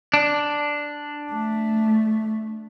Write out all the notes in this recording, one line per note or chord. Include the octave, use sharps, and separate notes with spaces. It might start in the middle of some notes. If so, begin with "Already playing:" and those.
D4
A3